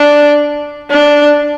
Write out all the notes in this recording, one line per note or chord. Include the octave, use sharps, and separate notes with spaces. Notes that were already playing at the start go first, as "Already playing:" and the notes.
Already playing: D4
D4